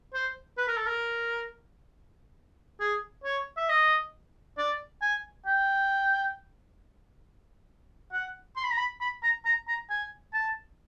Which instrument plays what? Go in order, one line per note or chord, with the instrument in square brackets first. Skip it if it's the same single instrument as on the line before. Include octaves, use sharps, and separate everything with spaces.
[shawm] C5
B4
A#4
A4
A#4
G#4
C#5
E5
D#5
D5
G#5
G5
F#5
C6
B5
A#5
B5
B5
A#5
A#5
A#5
G#5
A5